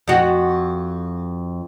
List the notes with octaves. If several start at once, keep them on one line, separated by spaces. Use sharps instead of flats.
F2 F#4